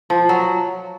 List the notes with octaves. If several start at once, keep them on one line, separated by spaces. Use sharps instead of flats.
F3
F#3